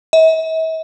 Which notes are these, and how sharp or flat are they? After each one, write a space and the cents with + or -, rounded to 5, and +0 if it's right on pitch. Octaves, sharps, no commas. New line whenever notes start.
E5 -45